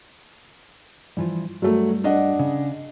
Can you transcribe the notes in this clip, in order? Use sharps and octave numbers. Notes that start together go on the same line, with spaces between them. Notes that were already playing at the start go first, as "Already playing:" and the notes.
G2 E3 F3
G2 F#3 A3
D4 D#5 F#5
C#3